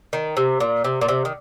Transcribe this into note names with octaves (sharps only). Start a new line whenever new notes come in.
D#3
C3
A#2
C3
A#2
C3
D#3